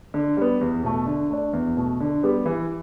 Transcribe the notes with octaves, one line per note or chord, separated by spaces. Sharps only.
D3
G3 B3
E2
B2 A3
D3
A3 D4
E2
B2 A3
D3
G3 B3 G4
E3